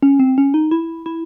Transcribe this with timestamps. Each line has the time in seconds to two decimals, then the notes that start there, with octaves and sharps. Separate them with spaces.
0.03 C#4
0.19 C4
0.38 C#4
0.54 D#4
0.71 E4
1.06 E4